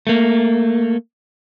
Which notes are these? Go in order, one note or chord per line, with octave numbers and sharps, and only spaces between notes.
A3 A#3